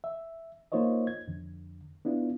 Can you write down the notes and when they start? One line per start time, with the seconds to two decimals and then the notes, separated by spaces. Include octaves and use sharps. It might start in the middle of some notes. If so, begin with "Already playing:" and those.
0.04 E5
0.72 A#3 D#4 F4 C5 C#5 D#5
1.07 G#6
1.28 F2 D3
2.05 B3 D4 E4 F4